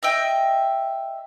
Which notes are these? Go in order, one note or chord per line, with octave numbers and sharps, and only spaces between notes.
D#5 E5 G5